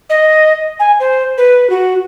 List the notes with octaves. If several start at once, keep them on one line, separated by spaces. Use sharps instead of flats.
D#5
G#5
C5
B4
F#4